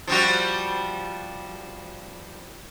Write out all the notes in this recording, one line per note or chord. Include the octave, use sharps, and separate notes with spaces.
F3 G3 F#4